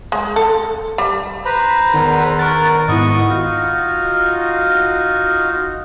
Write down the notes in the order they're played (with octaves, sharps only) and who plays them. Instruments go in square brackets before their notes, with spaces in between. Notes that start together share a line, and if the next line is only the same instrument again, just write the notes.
[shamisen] G#3
A4
G3
[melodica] B4 C5 A#5 [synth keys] B5
[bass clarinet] E2 [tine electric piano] D#3
[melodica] A#4 [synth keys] C#6 F#6 A6
[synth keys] G#2 E4 [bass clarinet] B3 [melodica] D#5 C#6
[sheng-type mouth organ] D#4 F4 F#4